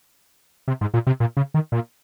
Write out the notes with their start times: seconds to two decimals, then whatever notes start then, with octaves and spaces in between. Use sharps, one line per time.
0.68 C3
0.81 G#2
0.94 A#2
1.07 C3
1.20 A#2
1.37 C#3
1.54 D#3
1.72 A#2